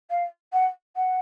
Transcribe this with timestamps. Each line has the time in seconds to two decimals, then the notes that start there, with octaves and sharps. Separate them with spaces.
0.10 F5
0.52 F#5
0.95 F#5